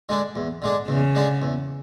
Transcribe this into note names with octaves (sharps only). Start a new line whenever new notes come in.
D3 G#3 D4
E2
D3 G#3 D4
E2 C#3
D3 G#3 D4
E2